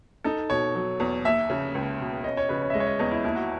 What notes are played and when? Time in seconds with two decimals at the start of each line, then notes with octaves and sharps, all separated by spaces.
0.24 D#4 A4
0.50 B2 C#5
0.75 F#3
1.00 E2
1.25 D#2 E5
1.50 C#3
1.75 C#2
1.99 B2
2.24 C#4 D#5
2.37 C#5
2.49 C#3 B4
2.62 C#5
2.70 E5
2.74 G#3 D#5
2.80 C#5
2.87 D#5
2.99 E2 D#5
3.12 E4
3.24 D#2 E4
3.35 F#4